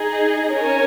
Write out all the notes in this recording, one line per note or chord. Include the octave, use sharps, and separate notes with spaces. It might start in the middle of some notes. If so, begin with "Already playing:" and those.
Already playing: D#4 G#4 D#5
C#4 A#4 C#5 G#5